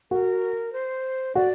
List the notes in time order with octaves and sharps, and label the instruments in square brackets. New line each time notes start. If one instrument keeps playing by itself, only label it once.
[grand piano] F#4 [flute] A#4
[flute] C5
[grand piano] F#4 [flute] D5